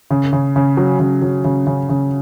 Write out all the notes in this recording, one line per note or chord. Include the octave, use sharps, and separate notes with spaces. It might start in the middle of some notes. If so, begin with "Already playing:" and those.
C#3
C#3
C#3
F#3
C#3
F#3
C#3
C#3
C#3